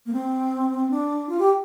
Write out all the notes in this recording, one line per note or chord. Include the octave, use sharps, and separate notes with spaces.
A#3
C4
D4
F4
G4